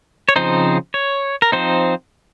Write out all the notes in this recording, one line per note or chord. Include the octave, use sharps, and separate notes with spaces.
C#5
C#3 F3 C4 D#4 C5
C#5
A#4
F3 C4 D#4 C5